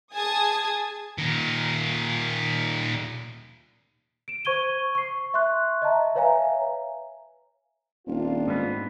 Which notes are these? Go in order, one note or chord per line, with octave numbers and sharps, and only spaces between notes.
G#4 G#5 A5 D#6 G#6
A#2 D#3
D7 E7
C5 C#6 G#6 D#7 G7
C#6 C7
E5 C6 C#6 F#6
D#5 E5 A5 A#5
B4 C#5 E5 F5 G#5 A#5
D#1 C4 D4 F4
G#2 G#3 B3